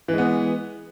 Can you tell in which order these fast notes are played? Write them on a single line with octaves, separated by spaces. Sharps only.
E3 G#3 B3